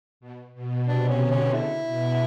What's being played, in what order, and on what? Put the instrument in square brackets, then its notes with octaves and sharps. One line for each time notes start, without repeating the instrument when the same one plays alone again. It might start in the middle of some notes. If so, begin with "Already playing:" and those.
[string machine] B2
B2
[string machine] C3 [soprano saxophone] D4
[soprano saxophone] C#4
[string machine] D3
[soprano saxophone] C#4
[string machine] C#3 [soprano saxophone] E4
[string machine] B2